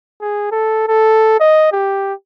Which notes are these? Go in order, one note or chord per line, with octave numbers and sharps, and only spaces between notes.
G#4
A4
A4
D#5
G4